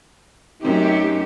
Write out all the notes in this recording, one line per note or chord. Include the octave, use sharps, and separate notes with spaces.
F#2 A3 C4 D#4 G4